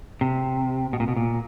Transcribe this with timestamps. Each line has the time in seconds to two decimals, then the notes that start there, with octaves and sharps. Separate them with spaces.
0.21 C3
0.93 B2
1.00 A#2
1.08 B2
1.17 A#2